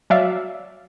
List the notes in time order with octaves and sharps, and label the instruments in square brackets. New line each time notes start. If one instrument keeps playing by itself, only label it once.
[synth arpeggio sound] F#3 D5 E5 F5